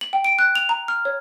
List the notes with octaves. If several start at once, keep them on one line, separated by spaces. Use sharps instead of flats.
F#7
G5
D7
F#6
F7
A#5
F6
C#5